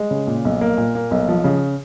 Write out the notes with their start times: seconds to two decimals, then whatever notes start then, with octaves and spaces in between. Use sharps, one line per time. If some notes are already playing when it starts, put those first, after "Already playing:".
Already playing: G#3
0.11 C#3
0.27 A#2
0.45 B1
0.61 A#3
0.77 A#2
0.95 A#3
1.11 B1
1.29 F3
1.44 C#3